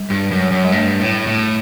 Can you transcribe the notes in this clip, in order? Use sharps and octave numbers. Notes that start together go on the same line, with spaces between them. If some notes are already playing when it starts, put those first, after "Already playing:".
Already playing: G3
G2
F#2
F#2
G3
G2 A3
A2
A2